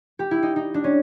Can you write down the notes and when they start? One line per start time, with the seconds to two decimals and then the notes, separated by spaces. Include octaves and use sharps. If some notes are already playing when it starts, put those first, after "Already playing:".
0.19 G4
0.31 E4
0.43 D#4
0.56 D#4
0.74 D4
0.84 C#4